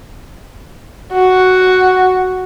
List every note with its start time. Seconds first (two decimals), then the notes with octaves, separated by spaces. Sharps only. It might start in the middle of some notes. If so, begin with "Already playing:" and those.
1.12 F#4